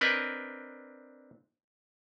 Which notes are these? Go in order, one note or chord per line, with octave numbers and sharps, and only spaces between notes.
C4 D4 A#4 B4 D#5 G#5